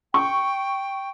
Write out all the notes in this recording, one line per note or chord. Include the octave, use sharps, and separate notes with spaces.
G5 C#6